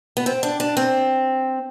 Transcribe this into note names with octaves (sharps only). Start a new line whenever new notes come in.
B3
C4
D4
D4
C4